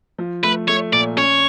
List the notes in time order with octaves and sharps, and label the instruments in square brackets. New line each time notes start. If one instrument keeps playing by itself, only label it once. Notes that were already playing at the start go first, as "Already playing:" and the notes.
[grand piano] F3
[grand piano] A3 [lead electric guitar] B4
[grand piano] A3 [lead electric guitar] C#5
[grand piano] A#2 [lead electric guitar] D5
[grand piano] C#4 [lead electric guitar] C#5